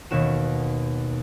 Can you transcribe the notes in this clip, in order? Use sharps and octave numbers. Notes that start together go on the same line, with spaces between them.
D#2 B2 F#4 E7